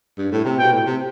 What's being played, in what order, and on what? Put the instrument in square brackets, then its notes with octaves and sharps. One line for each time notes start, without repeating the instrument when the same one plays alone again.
[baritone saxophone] G2
A2
C3
[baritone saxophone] B2 [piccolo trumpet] G5
[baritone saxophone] A2
C3